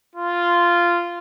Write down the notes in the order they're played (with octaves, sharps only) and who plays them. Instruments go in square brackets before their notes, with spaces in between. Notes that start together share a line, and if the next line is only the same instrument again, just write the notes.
[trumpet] F4